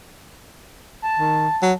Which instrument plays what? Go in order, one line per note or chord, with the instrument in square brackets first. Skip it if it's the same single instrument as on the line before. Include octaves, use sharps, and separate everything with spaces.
[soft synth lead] A5
[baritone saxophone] D#3
F#3